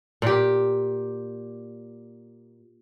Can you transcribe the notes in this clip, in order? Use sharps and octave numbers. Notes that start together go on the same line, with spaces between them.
A#2 G4